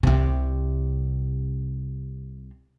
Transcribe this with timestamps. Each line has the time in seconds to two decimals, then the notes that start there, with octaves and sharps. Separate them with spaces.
0.03 C2 C3